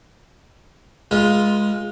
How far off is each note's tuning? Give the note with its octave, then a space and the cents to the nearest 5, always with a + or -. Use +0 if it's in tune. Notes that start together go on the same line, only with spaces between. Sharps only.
G#3 +0 F4 +0 B4 -40